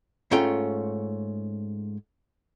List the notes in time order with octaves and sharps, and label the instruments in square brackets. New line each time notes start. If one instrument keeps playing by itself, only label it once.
[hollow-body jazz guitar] G#2 A3 C#4 F4 G5